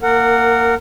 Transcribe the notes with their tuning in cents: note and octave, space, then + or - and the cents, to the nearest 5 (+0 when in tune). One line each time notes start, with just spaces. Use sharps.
A#3 +0 A#4 -20 F#5 +0